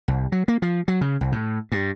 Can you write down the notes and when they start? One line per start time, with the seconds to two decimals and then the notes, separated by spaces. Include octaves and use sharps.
0.08 C2
0.32 F#3
0.48 A#3
0.62 F3
0.88 F#3
1.01 C#3
1.21 C2
1.32 A2
1.72 G2